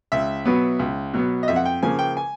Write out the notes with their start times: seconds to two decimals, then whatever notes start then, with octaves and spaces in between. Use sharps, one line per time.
0.12 C#2 E5
0.46 B2 F#3 B3
0.79 C#2
1.14 B2 F#3 B3
1.43 D#5
1.48 F2 E5
1.56 F#5
1.65 G5
1.83 C#3 F3 A#3 G#5
1.99 G5
2.17 G#5